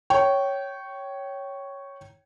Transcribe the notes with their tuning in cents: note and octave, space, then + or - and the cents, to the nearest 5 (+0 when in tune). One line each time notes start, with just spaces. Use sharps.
C#5 +0 G5 -20